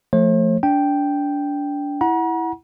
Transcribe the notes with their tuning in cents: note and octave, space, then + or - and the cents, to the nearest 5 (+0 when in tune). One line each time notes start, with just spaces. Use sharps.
F3 -15 A3 +0 C5 +45
D4 -25 G5 +0
E4 +0 F#5 +0 A#5 +45